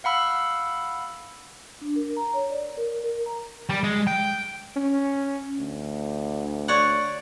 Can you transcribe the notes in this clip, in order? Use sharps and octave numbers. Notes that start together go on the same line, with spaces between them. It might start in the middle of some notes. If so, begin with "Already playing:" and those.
F5 F#5 B5 E6
D4
A#4
A#5
C#5
D5
A#4
A#4
A#5
G3
G#3
G5
C#4
D2
C#5 D5 F#5